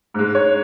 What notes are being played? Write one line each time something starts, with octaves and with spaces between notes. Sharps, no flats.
G#2 G#3
C#5